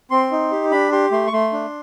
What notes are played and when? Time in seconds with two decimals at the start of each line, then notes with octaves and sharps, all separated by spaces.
0.11 C4 C6
0.31 D#4
0.52 G4
0.71 D4 B5
0.92 G4 C6
1.12 A3 C6
1.27 C#6
1.32 A3 C6
1.53 D4